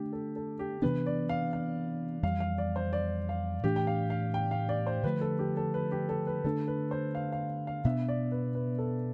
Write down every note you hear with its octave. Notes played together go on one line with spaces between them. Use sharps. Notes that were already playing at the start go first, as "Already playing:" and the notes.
Already playing: D3 A3 D4 G4
A4
A4
G4
C3 E3 B3 D4 B4
D5
F5
F5
F2 E3 G3 F5
F5
D5
C5
D5
F5
A2 E3 A3 D4 G4
G5
F5
F5
G5
F5
D5
C5
D3 F3 A3 B4
A4
G4
A4
B4
G4
A4
B4
D3 A3 D4 A4
B4
C5
F5
F5
F5
B2 B3 D4 E5
D5
B4
B4
A4